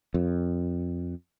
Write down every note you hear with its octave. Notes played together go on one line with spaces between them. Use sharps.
F2